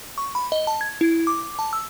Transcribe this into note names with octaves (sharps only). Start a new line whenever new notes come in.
C#6
B5
D#5
A5
G#6
E4
D6
A5
E6